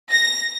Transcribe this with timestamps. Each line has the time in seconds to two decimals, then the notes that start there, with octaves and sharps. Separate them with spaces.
0.11 A#6